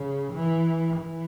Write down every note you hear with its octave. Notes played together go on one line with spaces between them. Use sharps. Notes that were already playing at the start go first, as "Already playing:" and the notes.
Already playing: C#3
E3
E3